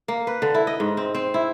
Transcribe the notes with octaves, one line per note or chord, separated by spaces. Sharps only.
A#3
B4
D3
E4
D#5
G#2
C4
C4
E4